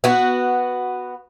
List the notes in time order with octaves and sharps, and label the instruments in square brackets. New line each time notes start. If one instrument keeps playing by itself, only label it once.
[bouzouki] B3 F#4